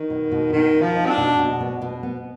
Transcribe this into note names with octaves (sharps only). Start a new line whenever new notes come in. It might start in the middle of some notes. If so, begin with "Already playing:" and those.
Already playing: D#3
B2
B2
B2 D#3
D#4
F3
D#4
C4
D4
B2
B2
B3
B2
B3